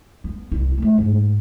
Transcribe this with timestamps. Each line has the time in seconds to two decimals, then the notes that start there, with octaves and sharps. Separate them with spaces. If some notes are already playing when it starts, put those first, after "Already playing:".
0.24 B3
0.52 C2 E4
0.78 G#3 A3
0.98 G#2